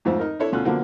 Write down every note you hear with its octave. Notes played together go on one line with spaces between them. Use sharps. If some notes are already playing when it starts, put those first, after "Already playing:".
F2 G#2 F3 A3 C4
D#4 A#4
D4 E4 A4 C#5
D2 B2 C#4 F4 A4 F#6
B2 D3 F3 F#3 A#3